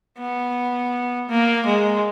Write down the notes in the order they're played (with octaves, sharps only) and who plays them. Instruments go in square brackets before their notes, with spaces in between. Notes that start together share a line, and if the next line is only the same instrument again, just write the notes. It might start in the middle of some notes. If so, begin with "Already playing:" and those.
[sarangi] B3
A#3
G#3